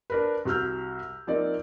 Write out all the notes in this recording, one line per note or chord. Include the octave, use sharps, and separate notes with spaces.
D4 A#4 B4
C2 F#4 E6 F6 G6
F3 A#3 C4 D#4 D5